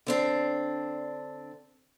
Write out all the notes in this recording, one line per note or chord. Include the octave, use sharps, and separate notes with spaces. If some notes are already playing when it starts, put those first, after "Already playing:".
D3 C4 D4